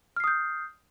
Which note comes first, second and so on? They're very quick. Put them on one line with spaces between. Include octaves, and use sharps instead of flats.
F6 C7 D#6 G6